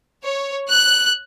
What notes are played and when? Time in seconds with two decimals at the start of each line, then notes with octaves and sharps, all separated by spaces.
0.23 C#5
0.69 F#6